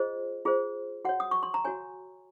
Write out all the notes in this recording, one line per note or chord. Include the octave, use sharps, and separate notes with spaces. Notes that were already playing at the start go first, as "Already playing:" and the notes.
Already playing: F4 G#4 C5 D#5
F4 G#4 C5
F#4 C#5 F#5
D#6
C#6
C6
A#5
F#4 C#5 G#5